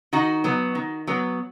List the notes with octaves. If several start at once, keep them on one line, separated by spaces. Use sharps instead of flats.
D#3 D#4 F#4
F#3 B3
D#3
F#3 B3